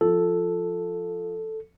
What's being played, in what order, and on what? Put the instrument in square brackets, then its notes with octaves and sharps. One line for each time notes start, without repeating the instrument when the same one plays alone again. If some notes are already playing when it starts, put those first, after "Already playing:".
[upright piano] F3 [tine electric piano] A4